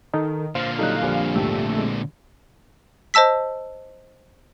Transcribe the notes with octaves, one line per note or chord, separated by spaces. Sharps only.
D#3 D#4 A4
A#2 D3 C5 F5
F#3 G3 D#4 A4 F#6
A#1 G3
E2 G#2 A3 G4
G#3 C4
C5 D#5 A5 E6 B6